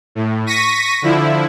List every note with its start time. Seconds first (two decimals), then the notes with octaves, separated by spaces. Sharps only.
0.15 A2
0.46 C#6 A#6 B6 D#7
1.02 D3 F3 E4